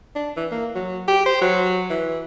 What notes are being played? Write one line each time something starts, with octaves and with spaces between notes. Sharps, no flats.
D4
E3
A#3
F#3
G4
C5
F#3
E3